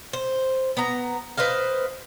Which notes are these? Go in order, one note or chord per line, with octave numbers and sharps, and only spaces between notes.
C5
B3 A#5
B4 C5 D#5 F5